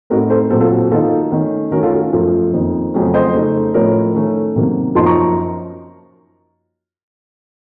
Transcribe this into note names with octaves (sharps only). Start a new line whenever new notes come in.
A2 A3 C4 D#4 F#4 A#4
A4 C5
A#2 F#3 C4 A4 C5
F4 A4
F#4
F#4
D#3 A#3 D#4 F4 A4
D#3 A3 C#4
D#3 A3 C#4 F#4 A#4
F4 A4
F#4
F4
F#2 F3 A3
F2 D#3 A#3 D#4
F2 C#3 F#3 A3 C#4
C5 D#5
C#3 A3 D#4
A2 F3 A3 A#4 C#5
D#3 A3 C#4
C3 D#3 F#3 A#3
F#2 F3 A#3 D#4 A5 C6
A#5 C#6